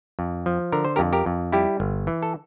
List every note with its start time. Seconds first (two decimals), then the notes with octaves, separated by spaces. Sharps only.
0.19 F2
0.46 F3
0.72 D3 A#4
0.85 C5
0.96 F2 G4 A#4
1.13 G4 A#4
1.26 F2
1.52 G3 E4 G4
1.80 G1
2.07 E3
2.23 A4